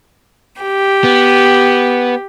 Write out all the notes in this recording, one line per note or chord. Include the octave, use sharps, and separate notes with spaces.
G4
B3